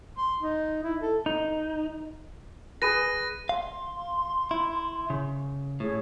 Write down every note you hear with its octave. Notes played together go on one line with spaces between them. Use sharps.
C6
D#4
E4
A4
D#4
G#4 B4 A#6 D#7
F5 C6
E4
C#3
A2 G#4 C#5